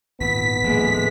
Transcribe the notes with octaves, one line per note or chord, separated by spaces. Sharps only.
G#1 A#2 B3 B6
D#1 A2 F3 G#3 A#3